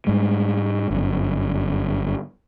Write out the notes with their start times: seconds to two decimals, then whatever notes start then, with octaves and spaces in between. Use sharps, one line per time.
0.07 G#2 G3 G#3
0.91 G1 F#2